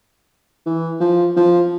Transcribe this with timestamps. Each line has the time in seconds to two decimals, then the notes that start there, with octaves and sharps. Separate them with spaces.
0.66 E3
1.00 F3
1.36 F3